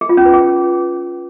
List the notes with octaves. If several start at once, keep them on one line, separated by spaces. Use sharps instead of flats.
G#4
F4
C#4
B4
G#4